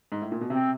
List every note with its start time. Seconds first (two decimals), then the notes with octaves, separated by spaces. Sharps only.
0.12 G#2
0.22 A2
0.32 A#2
0.41 B2
0.50 C3 C4